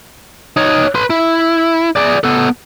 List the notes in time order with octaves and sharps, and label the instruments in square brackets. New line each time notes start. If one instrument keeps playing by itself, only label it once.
[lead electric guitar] D#4 C#5
B4 C6
E4
G#4 D5
B3 A4